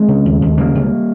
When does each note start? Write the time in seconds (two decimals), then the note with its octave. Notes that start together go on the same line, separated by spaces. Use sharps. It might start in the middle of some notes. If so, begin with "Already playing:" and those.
Already playing: G#3 C4
0.08 C#3
0.25 D#2
0.41 D#2
0.58 C#3 G3 A#3
0.75 C#2